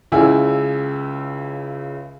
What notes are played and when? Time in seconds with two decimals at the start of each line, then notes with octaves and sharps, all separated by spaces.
0.12 C#2 C#3 E4 G#5 E6